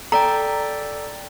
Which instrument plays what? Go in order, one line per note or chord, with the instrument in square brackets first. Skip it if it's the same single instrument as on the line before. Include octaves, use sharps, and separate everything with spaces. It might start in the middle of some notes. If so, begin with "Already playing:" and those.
[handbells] A4 D5 G5 [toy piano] A#5